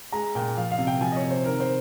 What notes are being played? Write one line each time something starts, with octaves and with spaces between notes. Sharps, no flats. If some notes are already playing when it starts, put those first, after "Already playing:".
G#3 A#5
A#2 G5
F3 F5
F5
C3
G5
F3 G#5
D#5
C#5
C3
C5
D#3 A#4
C5